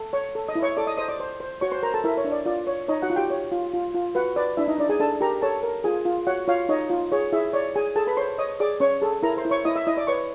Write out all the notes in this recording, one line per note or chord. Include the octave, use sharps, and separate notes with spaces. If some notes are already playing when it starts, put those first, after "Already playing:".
Already playing: A4
C#5 C#6
A4
D#5 D#6
E4
C#5 C#6
A4 D5 D6
D#5 D#6
C5 D#5 D#6
D5 D6
C5
C5
F#4 C#5 C#6
C5 C6
A#4 C5 A#5
A4 A5
E4 A#4 E5
C#5
D4
D5
F4 D5
C#5
D#4 C#5 D#5
F#4 F#5
F4
G4 G5
C#5
F4
F4
F4
F#4 B4 F#5
B4 D5
D4 E4 E5
D#4 D#5
D4 D5
G#4 G#5
D4 A4 A5
G4 A#4 A#5
A4 C#5 A5
A#4
F4 G#4 G#5
F4
F#4 C#5 F#5
F4 C#5 F5
D#4 C#5 D#5
F4
G#4 C#5
E4 G#4 E5
C#5 D5
G#4 G#5
G#4 A4 A5
B4 B5
C5 C#5 C6
C#5 D#5 D#6
G#4 D5 D6
C#4 C#5 C#6
G#4 A4 A5
E4 A#4 A#5
C5 C6
E4
C#5 C#6
E4 D#5 D#6
E5 E6
E4 D#5 D#6
D5 D6
B4 C#5 C#6